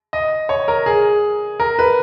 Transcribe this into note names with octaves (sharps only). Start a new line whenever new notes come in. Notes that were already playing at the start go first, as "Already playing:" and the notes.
D#5
C#5
A#4
G#4
A#4
B4